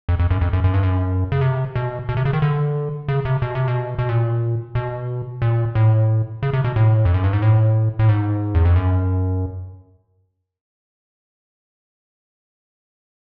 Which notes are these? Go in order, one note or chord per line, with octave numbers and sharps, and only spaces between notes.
F2
F2
F#2
F2
F#2
F#2
G2
F#2
C#3
C3
B2
B2
C3
C#3
D#3
D3
C#3
C3
B2
C3
B2
B2
A#2
B2
A#2
A2
C#3
C3
B2
A2
F2
F#2
G2
G#2
A2
A2
G#2
E2
F2
F#2